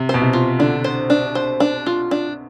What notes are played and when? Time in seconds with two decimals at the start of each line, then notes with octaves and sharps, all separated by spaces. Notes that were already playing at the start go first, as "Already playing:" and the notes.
Already playing: C3
0.09 B2 C5
0.22 C3
0.33 F4
0.59 D3 D4
0.84 C5
1.10 D4
1.35 C5
1.60 D4
1.86 F4
2.11 D4